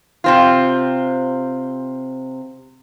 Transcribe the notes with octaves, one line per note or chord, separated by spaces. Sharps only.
C3 C4 F4